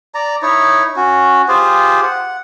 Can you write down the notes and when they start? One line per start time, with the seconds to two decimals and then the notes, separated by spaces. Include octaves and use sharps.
0.14 D5 A#5
0.42 D#4 E4 C#5
0.96 C#4 F#4
1.48 F4 G4 G#4 C5
2.03 F#5